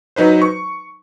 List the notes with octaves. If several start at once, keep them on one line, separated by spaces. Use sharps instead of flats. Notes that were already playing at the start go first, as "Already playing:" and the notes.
F#3 D#4 B4 C5
C#6